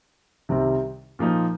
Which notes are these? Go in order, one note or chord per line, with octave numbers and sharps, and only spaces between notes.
C2 C3 D#3 G3 C4
A#2 F3 A#3 D#4